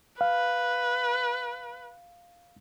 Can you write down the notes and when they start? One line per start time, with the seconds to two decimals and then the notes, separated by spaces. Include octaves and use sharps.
0.21 B4 F5